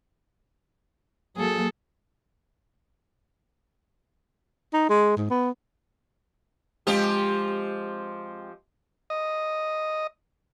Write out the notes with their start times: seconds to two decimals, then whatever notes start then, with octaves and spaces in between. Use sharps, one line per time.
1.37 F#3 A#3 G#4 A4
4.73 D#4
4.89 G#3
5.17 G#2
5.30 B3
6.87 F3 G#3 C4 G4 D#5
9.10 D#5